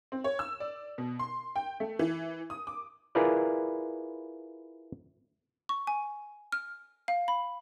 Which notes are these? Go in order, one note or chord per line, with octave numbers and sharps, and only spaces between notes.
C4
C#5
E6
D5
B2
C6
G5
A3
E3
D#6
D6
E4 F4 G#4 A#4 B4 D5
C#6
G#5
F6
F5
B5